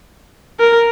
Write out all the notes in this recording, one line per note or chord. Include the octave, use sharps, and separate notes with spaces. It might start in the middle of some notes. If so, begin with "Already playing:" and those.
A#4